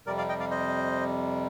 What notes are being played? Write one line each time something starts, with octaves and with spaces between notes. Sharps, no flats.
F2 C3 G3 A#4 D5
D5 F5
D#5 G5
D5 F5
C5 D#5